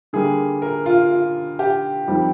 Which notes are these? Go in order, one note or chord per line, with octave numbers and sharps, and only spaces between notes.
D3 G3 A#3 G#4
A#4
F4
F4
G4
F2 D#3 G3 C4